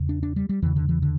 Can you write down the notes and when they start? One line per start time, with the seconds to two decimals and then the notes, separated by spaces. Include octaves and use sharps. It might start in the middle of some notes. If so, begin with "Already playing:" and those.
Already playing: E2 C#3
0.09 D4
0.23 D4
0.36 G3
0.49 G3
0.62 E2 C#3 E3
0.76 D3
0.89 E3
1.02 D3